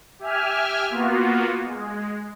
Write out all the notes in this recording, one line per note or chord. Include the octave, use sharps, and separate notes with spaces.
G4 E5 G#5 F6
A#3 B3 F4 F#4
G#3